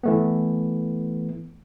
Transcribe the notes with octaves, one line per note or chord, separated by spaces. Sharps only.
E3 A3 B3